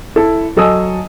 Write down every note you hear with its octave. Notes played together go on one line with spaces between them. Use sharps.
E4 A4
F#3 A4 D#5 G#5 D#6 E6